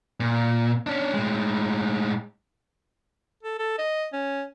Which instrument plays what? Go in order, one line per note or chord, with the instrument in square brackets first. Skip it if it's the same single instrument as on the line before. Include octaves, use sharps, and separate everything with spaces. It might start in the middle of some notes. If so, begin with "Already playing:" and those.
[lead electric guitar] A#2
C#4 D4
A2 G#3
[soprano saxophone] A4
A4
D#5
C#4